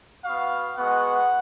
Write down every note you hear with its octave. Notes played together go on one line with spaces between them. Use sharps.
B3 F#4 F5
G#3 B3 F#4 F#5